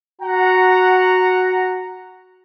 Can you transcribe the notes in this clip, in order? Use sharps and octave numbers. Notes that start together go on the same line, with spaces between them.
F#4 F#5 A#5